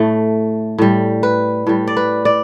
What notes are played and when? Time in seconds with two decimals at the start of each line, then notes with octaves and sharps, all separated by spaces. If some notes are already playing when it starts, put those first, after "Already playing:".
Already playing: A2 A3
0.78 A2 G3
1.23 B4
1.67 A2 G3
1.88 D5
1.97 B4
2.25 D5